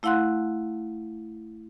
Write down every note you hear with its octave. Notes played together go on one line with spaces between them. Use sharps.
A3 E4 F5 F#5 C6 F#6